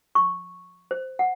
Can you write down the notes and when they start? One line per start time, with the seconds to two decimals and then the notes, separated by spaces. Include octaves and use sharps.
0.15 C#6
0.91 C5
1.19 F#5